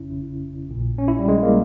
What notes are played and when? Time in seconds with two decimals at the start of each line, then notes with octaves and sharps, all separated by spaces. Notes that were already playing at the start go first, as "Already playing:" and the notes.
Already playing: G1 F2 C#3 C#4 E4
0.69 A#1 A#2
0.98 C#4
1.08 E4
1.19 G3
1.28 G#3
1.43 A#3